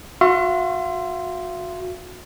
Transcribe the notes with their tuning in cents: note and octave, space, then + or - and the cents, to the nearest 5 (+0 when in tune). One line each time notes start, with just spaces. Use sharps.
F#4 -30 E5 +45 C6 +0